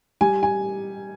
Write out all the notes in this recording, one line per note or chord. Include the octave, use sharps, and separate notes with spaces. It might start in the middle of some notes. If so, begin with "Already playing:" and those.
G3 G#5
G#5